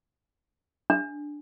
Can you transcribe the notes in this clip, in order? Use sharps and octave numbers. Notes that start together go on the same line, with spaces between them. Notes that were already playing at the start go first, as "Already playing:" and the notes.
D4